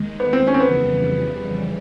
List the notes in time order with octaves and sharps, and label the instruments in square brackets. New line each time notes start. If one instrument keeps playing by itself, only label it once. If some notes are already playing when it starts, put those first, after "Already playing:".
Already playing: [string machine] D#2 D#3 G#3
[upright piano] B3
C4
C#4
C4
[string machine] F2 C#3 E3 G3 [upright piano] B3